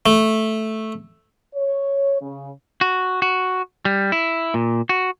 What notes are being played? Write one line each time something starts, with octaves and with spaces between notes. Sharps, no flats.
A3
C#5
C#3
F#4
F#4
G3
E4
A#2
F#4